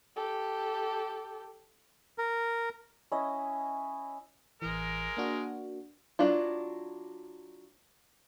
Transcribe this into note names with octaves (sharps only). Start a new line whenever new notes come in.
G4 A4
A#4
C#4 E4 D#5
A1 E3 G#3 A#4
A#3 D4 F#4
F#3 D4 E4 F4